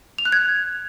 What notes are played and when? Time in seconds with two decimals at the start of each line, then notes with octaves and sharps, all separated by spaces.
0.18 F7
0.25 F#6
0.32 G#6